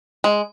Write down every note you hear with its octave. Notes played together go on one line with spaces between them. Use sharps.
G#3